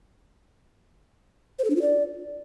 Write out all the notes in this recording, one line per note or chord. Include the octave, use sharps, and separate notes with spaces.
C5
A4
D4
F4
D5